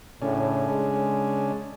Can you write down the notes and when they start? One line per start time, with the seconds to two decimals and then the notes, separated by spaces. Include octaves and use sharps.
0.22 A2 C#3 C#4 D4
0.69 G#3